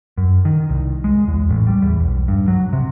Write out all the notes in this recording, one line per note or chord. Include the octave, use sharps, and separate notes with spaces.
F#2
D#3
C2
G#3
E2
A1
G3
E2
B1
G2
F#3
C3